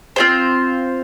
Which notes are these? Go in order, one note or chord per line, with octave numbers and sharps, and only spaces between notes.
C4 F4 G#4 C5